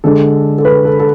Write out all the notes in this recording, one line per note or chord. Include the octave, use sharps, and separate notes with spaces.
D3 G#3 D4 A4
A4
B4
A4
A4